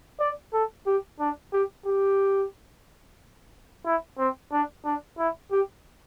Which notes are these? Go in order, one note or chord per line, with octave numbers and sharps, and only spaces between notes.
D5
A4
G4
D4
G4
G4
E4
C4
D4
D4
E4
G4